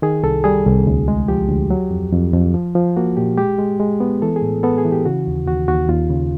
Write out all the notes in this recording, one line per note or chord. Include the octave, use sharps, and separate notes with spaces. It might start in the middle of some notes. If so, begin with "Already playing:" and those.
D#3 G#4
C2 A4
G3 G#4
C2
D2
G#3
F3 G4
D2
F#3
F2
F2
F2
F3
F3
A#3 F#4
A#2 G4
G#3 G4
G#3
G#3
B3
E3 A4
G#4
A2
B3 A4
G#4
E3
G4
C#3 F#4
D#2
D#2 F#4
D#2 F#4
D#2 F4
C#3